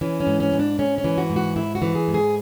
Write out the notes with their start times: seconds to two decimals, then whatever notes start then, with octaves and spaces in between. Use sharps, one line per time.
0.01 E3 C#4
0.20 C#4
0.27 G#2
0.40 C#4
0.53 G#2
0.59 D4
0.79 G#2 C#4
0.98 C#4
1.04 E3
1.18 F#4
1.30 G#2
1.36 F#4
1.56 G#2 E4
1.75 F#4
1.82 E3
1.95 G#4
2.08 G#2
2.14 G#4